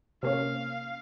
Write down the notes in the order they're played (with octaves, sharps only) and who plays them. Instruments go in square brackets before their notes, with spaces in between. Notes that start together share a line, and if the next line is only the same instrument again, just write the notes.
[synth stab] C3 A#3 C#4 [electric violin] F5